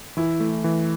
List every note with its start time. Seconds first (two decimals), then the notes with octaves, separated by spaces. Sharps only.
0.17 E3 E4
0.40 A3
0.64 E3